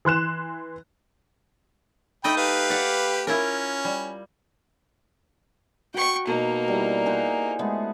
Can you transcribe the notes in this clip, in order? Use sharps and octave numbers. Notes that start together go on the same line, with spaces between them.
E3 C6 F#6 E7
A3 D#4 D#5 G5 B5
G4 B4 F5
D5 F#5
C#4 E4 F4 A#4
G3
F#4 G5 C#6
B2 A#3 D#4 C5 D6
G3 E4
G#4 C5 F#5
G#3 A3 B3